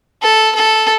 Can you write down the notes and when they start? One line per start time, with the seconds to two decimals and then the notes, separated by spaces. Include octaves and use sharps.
0.22 A4
0.55 A4